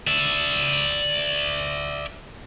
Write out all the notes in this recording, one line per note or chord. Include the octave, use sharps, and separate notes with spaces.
D5 E5